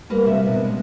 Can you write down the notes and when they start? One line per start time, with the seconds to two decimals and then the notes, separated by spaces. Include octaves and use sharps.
0.10 G3 A#3 B4
0.26 C3 G3 E5
0.46 B2 D4
0.65 G#3